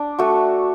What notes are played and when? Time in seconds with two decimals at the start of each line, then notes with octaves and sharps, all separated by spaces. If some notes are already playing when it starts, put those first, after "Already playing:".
Already playing: D4
0.19 A3 F#4